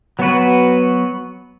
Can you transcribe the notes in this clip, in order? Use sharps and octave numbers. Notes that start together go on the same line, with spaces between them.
F#3 B3 F#4 B4